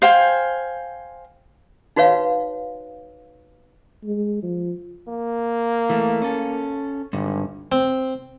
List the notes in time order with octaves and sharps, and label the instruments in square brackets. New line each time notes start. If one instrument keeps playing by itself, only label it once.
[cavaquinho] C5 F5 G5 G#5
[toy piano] D#4 F#4 B4 C#5 F5
[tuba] G#3
F3
[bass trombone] A#3
[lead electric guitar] E3 A3
C#4 A4
[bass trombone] G#1 [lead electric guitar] G2 D3
[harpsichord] C4